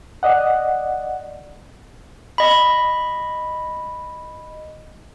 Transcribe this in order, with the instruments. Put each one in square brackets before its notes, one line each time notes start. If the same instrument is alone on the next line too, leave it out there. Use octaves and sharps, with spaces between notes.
[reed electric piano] D5 D#5 F#5
[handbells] D#5 B5